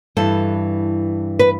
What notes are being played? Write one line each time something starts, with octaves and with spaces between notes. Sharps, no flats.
G2 E3 A4
B4